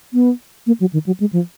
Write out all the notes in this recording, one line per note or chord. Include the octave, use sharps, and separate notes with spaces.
B3
A#3
F#3
D#3
F#3
G#3
F3